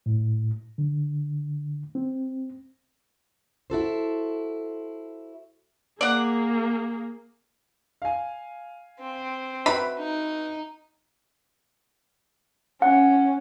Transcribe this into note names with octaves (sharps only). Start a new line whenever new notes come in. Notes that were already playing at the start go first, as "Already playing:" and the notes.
A2
D3
C4
E4 F#4 A4 C5
A#3 G#4 D5 F#5
F5 G#5
C4
F#4 B4 E5 B5
D#4
C#4 F#5